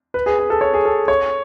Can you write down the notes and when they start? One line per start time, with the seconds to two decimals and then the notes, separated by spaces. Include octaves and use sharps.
0.14 B4
0.26 G#4
0.39 G#4
0.50 A4
0.61 C#5
0.74 G#4
0.85 A4
1.08 C#5